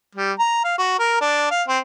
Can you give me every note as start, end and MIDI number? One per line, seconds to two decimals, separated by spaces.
0.15 0.33 55
0.39 0.62 82
0.64 0.75 77
0.78 0.95 66
0.99 1.20 70
1.21 1.50 62
1.51 1.63 77
1.68 1.79 60